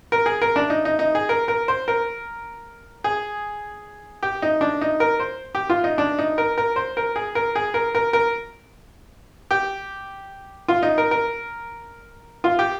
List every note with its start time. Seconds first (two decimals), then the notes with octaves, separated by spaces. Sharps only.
0.12 A#4
0.26 G#4
0.42 A#4
0.56 D4
0.70 D#4
0.85 D#4
0.99 D#4
1.15 G#4
1.29 A#4
1.48 A#4
1.68 C5
1.88 A#4
3.04 G#4
4.23 G4
4.42 D#4
4.61 D4
4.81 D#4
5.00 A#4
5.20 C5
5.55 G4
5.70 F4
5.84 D#4
5.98 D4
6.19 D#4
6.38 A#4
6.58 A#4
6.76 C5
6.97 A#4
7.16 G#4
7.35 A#4
7.55 G#4
7.74 A#4
7.95 A#4
8.13 A#4
9.51 G4
10.68 F4
10.83 D#4
10.98 A#4
11.11 A#4
12.44 F4
12.59 G4